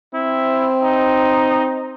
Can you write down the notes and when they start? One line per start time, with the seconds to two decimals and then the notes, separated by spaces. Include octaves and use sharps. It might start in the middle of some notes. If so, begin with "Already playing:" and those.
0.14 C4 E4
0.82 D#4